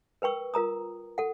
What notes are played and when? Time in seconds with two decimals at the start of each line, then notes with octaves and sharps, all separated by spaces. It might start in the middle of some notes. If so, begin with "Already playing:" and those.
0.22 A#4 B4 G5 C#6 E6
0.54 F4 A#4 A#5 D#6
1.18 A4 F#5